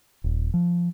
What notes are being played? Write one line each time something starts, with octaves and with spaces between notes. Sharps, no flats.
D#1
F3